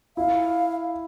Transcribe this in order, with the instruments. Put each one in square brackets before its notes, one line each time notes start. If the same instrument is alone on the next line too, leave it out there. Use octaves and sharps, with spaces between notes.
[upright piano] E4 [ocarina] F5